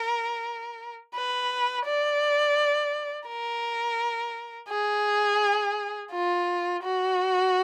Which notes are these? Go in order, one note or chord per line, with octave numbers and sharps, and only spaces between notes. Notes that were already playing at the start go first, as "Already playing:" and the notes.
Already playing: A#4
B4
D5
A#4
G#4
F4
F#4